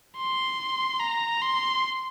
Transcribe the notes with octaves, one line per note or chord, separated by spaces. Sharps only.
C6
A#5
C6